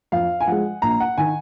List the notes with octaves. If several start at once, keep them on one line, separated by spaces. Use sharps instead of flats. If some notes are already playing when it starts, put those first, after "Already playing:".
F2 F5
G#5
F3 G#3 F#5
A#1 A#5
F#5
D#3 G#5